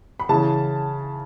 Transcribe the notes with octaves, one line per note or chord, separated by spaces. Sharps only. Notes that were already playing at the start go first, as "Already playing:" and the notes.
B5
C#3 E3 A5